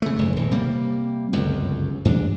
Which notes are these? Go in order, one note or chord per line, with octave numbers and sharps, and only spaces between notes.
C#3 A3
F#1 G#2
D#1
C3 G3 A#3
G1 C#2 F#2
G2 E3 C#4 D4